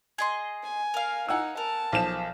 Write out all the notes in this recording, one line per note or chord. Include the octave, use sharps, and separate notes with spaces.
G#4 D#5 C6
G#5
A#4 F5
D#4 F#5 G#5 E6
A#4 A5
B1 F3 E7